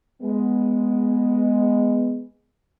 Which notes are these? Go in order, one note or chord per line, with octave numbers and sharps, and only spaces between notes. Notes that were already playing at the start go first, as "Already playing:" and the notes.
G#3 B3